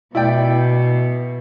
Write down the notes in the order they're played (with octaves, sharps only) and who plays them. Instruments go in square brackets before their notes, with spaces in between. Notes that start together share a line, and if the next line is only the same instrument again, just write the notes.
[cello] B2 [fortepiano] E4 D5 G5